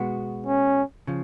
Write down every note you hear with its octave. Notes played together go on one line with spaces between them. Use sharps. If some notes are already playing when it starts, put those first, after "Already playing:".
Already playing: B2 G#3 B3 F#4
C#4
C#3 F3